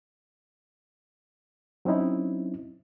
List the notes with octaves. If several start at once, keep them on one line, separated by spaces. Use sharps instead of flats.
F#3 C4 C#4 D#4 E4